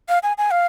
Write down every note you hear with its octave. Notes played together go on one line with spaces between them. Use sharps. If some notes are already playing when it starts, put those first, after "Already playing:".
F5
G#5
G#5
F5